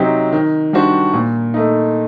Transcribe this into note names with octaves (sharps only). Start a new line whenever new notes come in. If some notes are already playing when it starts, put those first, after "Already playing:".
Already playing: C3 F#3 C4 D#4 G4
D#3
G3 D4 F#4 C5
A#2
A3 D#4